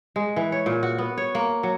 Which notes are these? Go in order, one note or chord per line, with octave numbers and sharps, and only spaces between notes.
G#3
E3
C#5
A#2
F#4
B3
C#5
A#3
F#3